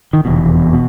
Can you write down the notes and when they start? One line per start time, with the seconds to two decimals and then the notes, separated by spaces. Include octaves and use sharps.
0.13 D#3
0.25 F1 E2 B2
0.73 B2